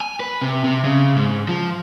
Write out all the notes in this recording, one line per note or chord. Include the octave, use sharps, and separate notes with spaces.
G#5
B4
C3
C3
C#3
G#2
F3